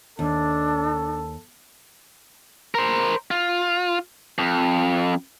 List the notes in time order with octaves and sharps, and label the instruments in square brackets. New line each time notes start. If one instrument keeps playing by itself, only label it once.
[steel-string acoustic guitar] D#2 [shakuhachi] D4 [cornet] A4
[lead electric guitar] A#4 C5
F4
F2